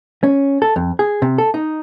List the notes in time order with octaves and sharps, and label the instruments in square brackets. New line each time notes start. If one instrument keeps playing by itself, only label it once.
[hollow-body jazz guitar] C#4
A4
F2
G#4
C3
A4
D#4